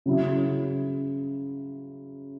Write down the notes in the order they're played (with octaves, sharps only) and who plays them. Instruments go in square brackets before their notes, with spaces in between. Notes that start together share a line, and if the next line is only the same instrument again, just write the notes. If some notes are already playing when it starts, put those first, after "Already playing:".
[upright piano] C#3 F#3 C#4 E4